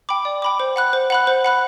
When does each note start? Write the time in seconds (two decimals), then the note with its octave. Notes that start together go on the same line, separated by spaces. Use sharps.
0.09 G5 B5 D6
0.25 D5
0.42 G5 B5 D6
0.60 C5
0.76 F#5 B5 F#6
0.93 C5
1.10 F#5 B5 F#6
1.27 C5
1.44 F#5 B5 F#6